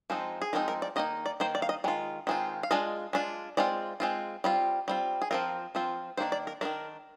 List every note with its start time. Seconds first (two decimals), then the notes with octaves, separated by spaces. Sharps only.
0.10 F3 G#3 C4 D#4
0.42 G#4
0.53 F3 G#3 C4 D#4 A#4
0.68 A#4
0.82 D5
0.96 D#3 A#3 D#4 D#5
1.26 D5
1.40 D#3 A#3 D#4 C5
1.55 D5
1.62 F5
1.69 D#5
1.84 D#3 G#3 F4
2.27 D#3 G#3 C4 F4
2.63 F5
2.71 G#3 D4 F4 D#5
3.13 G#3 D4 F4
3.57 G#3 C4 F4 D5
4.00 G#3 C4 F4
4.44 G3 C4 F4
4.88 G3 C4 F4
5.22 G#4
5.31 F3 C4 F4 A#4
5.75 F3 C4 F4
6.17 D#3 A#3 D4 C5
6.32 D5
6.47 A#4
6.61 D#3 A#3 D4 A#4